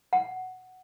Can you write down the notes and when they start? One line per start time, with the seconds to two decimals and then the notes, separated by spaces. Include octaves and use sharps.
0.13 F#5